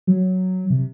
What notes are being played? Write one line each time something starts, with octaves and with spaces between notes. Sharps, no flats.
F#3
C3